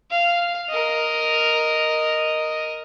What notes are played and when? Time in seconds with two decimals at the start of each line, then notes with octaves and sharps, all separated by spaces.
0.11 F5
0.69 A#4 D#5